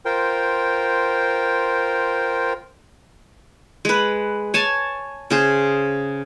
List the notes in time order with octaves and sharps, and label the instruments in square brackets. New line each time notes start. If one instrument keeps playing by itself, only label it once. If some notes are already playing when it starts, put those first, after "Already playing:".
[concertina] F4 A#4 C5 G5
[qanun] G#3 B4
C#5 G#5 A5
C#3 G#4 C5